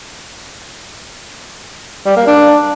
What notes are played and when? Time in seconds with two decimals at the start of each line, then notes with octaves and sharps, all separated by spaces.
2.06 G3
2.16 A#3
2.27 D4